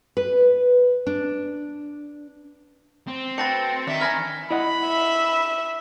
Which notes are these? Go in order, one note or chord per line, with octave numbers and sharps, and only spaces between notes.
B4
D4
C4
A3 F#4 B4 G5 A6 A#6 C#7
D#3 D4 E5
G#5 B5 F6 G#6 A#6
E4 D#5 F#5 B5
E5